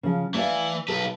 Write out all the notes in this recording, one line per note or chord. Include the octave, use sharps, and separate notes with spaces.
C#3 F3
E3 A3 D5 F5
B1 A4 B4